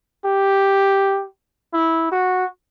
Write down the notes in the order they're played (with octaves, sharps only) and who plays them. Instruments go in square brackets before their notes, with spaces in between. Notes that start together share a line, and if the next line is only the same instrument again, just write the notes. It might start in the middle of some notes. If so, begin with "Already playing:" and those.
[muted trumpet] G4
E4
F#4